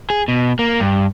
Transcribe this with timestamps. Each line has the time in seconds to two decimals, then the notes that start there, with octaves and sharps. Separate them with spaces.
0.10 G#4
0.28 B2
0.59 A#3
0.80 G2